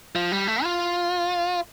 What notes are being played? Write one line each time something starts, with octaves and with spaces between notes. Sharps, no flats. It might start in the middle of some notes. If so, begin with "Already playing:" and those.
F3
G3
A3
F4